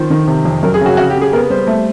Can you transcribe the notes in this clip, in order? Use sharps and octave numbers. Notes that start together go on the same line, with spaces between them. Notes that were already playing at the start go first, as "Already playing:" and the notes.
Already playing: D#3 F3 C5
D#3
C3
F2
F#2 A#4
G#4
C#3 F#4
C#3 F#4
G4
C#3
G#4
B3 A#4
G3 C5
A3